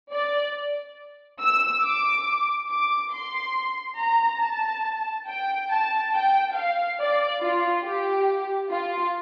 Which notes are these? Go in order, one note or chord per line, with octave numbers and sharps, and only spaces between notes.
D5
E6
D6
D6
C6
A#5
A5
G5
A5
G5
F5
D5
F4
G4
F4